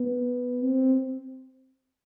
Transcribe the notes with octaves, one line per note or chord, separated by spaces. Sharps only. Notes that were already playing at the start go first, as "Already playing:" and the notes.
Already playing: B3
C4